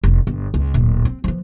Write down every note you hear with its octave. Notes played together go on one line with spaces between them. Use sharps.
F1
G1
C#2
D1 A#2
C4
E3 F3